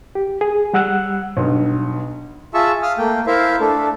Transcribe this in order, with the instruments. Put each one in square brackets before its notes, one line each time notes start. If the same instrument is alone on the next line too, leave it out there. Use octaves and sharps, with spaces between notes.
[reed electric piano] G4
G#4
G3 F#5 E6 F#6
[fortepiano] B1 G2
[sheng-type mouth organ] F4 G#4 E5 A5 C#6 E6
F5 D#6 F6
A3 A#3 G5
E4 A#4 C5 E5 F5
A3 D4 A4